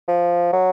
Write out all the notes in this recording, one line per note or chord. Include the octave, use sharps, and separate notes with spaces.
F3
F#3